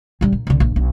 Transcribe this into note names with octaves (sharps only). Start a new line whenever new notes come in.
A#1 G3
A#2
C2 D3
A#1
B1